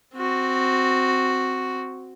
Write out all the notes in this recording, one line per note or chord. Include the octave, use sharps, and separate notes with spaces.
C4 F#4